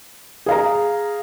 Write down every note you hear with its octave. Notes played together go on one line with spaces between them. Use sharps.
G#4 F5 A#5